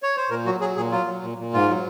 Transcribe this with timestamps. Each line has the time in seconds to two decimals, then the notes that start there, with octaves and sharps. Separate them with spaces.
0.03 C#5
0.17 C5
0.30 A#2 A#4
0.45 F#3 F#4
0.60 F#3 G#4
0.76 A#2 G#4
0.92 F#3 F4
1.06 F#3
1.22 A#2
1.38 A#2
1.53 G#2 F4
1.69 F#3